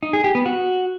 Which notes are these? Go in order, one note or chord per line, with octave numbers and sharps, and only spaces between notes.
D#4
G#4
G4
B3
F#4